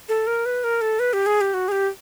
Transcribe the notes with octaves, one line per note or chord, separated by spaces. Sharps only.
A4
A#4
B4
A#4
A4
B4
G4
G#4
G4
F#4
G#4
G4